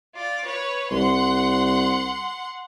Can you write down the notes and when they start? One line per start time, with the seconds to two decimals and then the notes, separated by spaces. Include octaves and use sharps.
0.13 F4 D5
0.44 B4 C#5
0.91 C2 F#5 C6